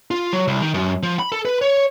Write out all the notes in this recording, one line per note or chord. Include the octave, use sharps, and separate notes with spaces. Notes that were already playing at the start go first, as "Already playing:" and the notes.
F4
F#3
C2
D#3
F#2
F3
B5
A4
B4
C#5